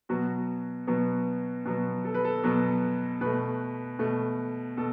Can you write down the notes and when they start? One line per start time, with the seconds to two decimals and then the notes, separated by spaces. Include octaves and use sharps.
0.09 B2 F#3 B3 F#4
0.87 B2 F#3 B3
1.65 B2 F#3 B3
2.05 A4
2.14 B4
2.24 A4
2.44 B2 F#3 B3
3.21 B2 A3 B4
3.99 B2 A3
4.77 B2 A4